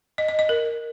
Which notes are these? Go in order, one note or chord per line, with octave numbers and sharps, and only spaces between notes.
D#5
D#5
D#5
A#4